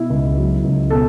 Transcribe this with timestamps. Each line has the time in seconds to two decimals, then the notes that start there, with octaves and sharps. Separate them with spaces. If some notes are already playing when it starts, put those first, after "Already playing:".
Already playing: B2 E4
0.10 C#2
0.37 F#3
0.64 C#2
0.90 B2 A4